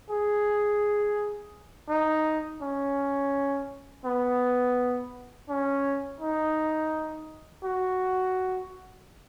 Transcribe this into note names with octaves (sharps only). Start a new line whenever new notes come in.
G#4
D#4
C#4
B3
C#4
D#4
F#4